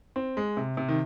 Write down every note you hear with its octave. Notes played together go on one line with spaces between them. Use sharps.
C4
G#3
C3
C3
D#3